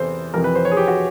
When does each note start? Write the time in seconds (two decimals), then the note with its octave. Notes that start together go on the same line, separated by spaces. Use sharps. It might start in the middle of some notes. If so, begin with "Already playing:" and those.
Already playing: E2 C3 E3 A4 C5
0.34 F2 C3 E3 A#4
0.44 B4
0.55 C5
0.65 C#5
0.72 G#4
0.77 G4
0.88 F#4